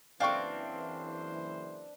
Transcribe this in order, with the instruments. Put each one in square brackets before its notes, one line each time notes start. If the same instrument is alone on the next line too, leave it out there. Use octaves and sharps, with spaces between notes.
[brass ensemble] F#1 E3 C5 [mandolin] C4 D4 [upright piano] F5 G5 C#6